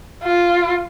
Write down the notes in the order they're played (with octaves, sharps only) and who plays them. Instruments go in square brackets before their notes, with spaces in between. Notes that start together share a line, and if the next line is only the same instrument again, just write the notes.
[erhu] F4